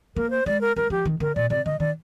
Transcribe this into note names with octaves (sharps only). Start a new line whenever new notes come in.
A#3 A#4
C5
G#3 D5
A#4
G3 A#4
F3 G4
D#3
D3 A#4
A#2 D5
C3 D5
D3 D#5
D#3 D5